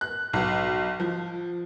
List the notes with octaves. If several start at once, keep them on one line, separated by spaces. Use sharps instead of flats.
F#6
B1
F3